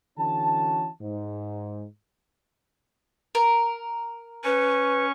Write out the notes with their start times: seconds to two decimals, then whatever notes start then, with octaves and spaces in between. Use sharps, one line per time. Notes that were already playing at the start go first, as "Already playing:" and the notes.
0.18 D3 E3 C#4 F#4 A5
1.01 G#2
3.35 A#4
4.44 C#4 B4 C#6